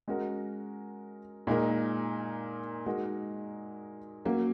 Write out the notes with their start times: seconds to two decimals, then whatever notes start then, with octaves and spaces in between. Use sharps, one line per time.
0.08 G#3 C#4 F#4 A#4
1.47 A#2 G#3 D#4 A#4
2.86 G#3 D#4 F#4 A#4
4.25 F#3 A#3 C#4